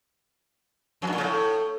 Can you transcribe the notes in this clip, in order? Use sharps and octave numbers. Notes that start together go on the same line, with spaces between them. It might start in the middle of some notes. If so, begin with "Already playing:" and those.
F2
G2
A#2
C#3
A2